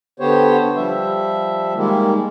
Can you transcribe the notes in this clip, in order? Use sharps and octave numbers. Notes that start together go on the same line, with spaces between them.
D3 B3 G4 C5 C#5
F3 G3 E5
D#3 G3 G#3 A#3